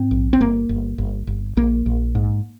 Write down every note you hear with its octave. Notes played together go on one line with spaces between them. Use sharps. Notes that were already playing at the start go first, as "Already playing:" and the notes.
Already playing: G#2 C4
A#1
C4
G1 A#3
G1
G1
G1
A#1 A#3
A#1
G#2